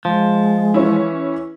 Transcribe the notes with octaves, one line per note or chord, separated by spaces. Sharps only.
F3 G#3
E3 C#4 E4